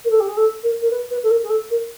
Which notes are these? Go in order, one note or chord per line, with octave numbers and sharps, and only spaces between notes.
A#4
A4
G4
G#4
A4
A#4
A#4
B4
B4
A4
A#4
G#4
A4
A#4